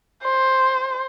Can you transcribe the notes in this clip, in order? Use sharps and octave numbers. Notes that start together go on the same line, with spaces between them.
C5